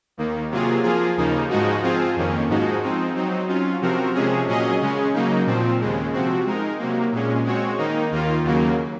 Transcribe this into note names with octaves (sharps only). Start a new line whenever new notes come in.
D#2 D#3 A#3
C3 F#3 A#3 F4 G#4
F3 A#3 F4 G#4
D#2 C#3 F3 A#3 D#4
G#2 F3 G#3 D#4 F#4
F3 C4 F4 G#4
F2 D#3 A#3 C#4
G#2 F3 G#3 D#4 F#4
F3 G#3 C4 D#4
F#3 C4 D#4
F#3 C#4 F4
C3 F3 C4 F#4 A#4
C3 F3 G#3 C#4 G#4
A#2 F#3 C#4 G#4 D#5
C#3 G#3 C#4
C#3 F#3 A#3 D#4
A#2 F3 C4
D#2 C#3 G#3
C3 F3 C4 F#4
G#3 D#4 A#4
C3 F#3 A#3
A#2 G#3 C#4
G#3 C4 F#4 C#5
D#3 A#3 D#4
D#2 D#3 A#3 F4
D#2 C#3 F#3 A#3